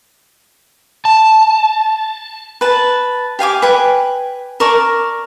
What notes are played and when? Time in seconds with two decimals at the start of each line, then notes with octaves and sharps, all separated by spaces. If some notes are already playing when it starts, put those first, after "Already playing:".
1.05 A5
2.61 B4 A5
3.39 G4 F5 G#5 D6
3.62 B4 G5 G#5
4.60 A#4 D5 A5 C#6